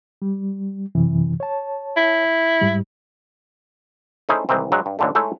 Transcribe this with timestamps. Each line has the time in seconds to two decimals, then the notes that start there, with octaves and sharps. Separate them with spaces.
0.22 G3
0.95 F#2 C3 E3
1.40 C#5 A5
1.97 E4
2.62 G#2 G3
4.29 A3 C#4 D#4 E4 G#4 C5
4.49 C2 G#2 D#3 E3 C4
4.72 G2 F#3 G#3
4.86 G2
4.99 D#2 A#2 D3 E3 A3
5.15 G#3 A3 D#4 E4 G#4 C#5